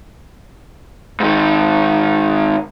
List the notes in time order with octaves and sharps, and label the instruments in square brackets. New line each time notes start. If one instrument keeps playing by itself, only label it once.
[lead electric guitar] G#2 D#3